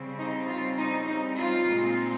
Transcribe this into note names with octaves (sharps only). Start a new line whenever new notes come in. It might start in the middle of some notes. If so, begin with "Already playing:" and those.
Already playing: C#3 G3 C4
D#4
F4
D#4
D#4
F4
A#2 G#3 C4 D#4